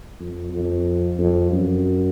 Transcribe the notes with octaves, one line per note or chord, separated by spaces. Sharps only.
F2
F2
F2
F#2